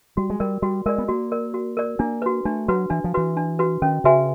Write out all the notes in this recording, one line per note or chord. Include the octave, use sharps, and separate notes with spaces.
G3 F#4
G#3
G3 A#4 D5
G3 F#4
G#3 A#4 D5
B3
A#3 F#4
A#4 D5
F#4
A#4 D5
A#3 D4
F#4 B4
A3 D4
F#3 F#4 B4
E3 D4
F3
E3 F#4 B4
D4
F#4 B4
D#3 C#4
C#3 F#4 B4 E5 G#5